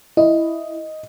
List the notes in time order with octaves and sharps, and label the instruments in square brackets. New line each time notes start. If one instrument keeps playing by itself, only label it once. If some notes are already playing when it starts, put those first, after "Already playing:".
[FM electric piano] E4 [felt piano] D#5